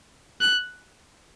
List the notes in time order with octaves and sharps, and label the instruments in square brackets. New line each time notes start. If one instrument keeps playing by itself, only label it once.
[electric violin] F#6